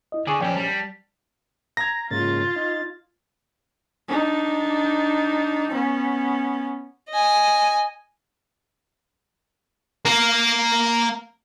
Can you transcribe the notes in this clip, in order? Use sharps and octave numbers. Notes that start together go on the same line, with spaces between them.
E4 D#5
D3 D4 G#4 D5 G#5 C#6
A#1 F2 C4 C#4 D5 G5
G3 A5
A#5 G#6 A#6
G#2 C#3 A#3 F4 A6
D#4
D4 D#4
B3 C#4
D#5 G#5
A#3 A#4